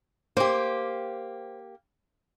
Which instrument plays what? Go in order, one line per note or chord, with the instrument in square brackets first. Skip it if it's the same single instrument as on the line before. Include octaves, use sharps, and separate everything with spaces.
[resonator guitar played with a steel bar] A#3 G4 [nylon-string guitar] C5